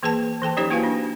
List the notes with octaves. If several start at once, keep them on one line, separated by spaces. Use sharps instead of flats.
E3 A#3 G#4 B4 G5 A5
E3 A4 G5 A5
F#3 C#4 D#4 G4 C5 C#5
A#3 E4 F#4 B4 F5 G#5
D4